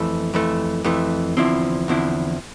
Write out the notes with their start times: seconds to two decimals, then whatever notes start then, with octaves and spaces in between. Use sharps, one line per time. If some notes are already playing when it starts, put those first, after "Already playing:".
Already playing: F2 E3 A3
0.34 F2 E3 A3
0.84 F2 E3 A3
1.37 E2 D3 F3 C4 E4
1.88 E2 D3 F3 C4 E4